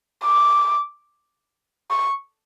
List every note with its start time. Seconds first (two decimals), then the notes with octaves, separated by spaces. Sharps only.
0.24 D6
1.91 C#6